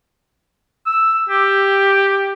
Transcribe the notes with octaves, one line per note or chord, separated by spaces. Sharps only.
E6
G4